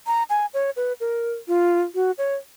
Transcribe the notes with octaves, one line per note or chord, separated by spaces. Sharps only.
A#5
G#5
C#5
B4
A#4
F4
F#4
C#5